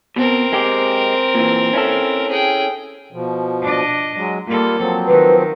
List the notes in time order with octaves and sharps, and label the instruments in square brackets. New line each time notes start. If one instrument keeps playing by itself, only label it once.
[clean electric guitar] B2 [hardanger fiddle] C4 A#4
[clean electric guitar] G#3 G4
A#2 E3
C#4 E4 A4
[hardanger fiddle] G#4 G5
[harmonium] B2 F3
[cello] D4 D#5
[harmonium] F#3 G#3
[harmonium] G3 F4 [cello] A#3 A4
[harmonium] F3 F#3 C4
[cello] D#3 [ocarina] B4